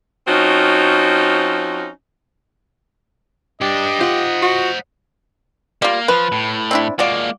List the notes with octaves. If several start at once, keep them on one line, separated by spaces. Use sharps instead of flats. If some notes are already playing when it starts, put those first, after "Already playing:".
F3 C4 C#4 D#4 F#4
G2 D4 G4 D#5
F4 C5 F#5
F#4
G3 A#3 F4
F3 B4
A2
C4 D4 E4
G#3 A#3 F4 F#4 D5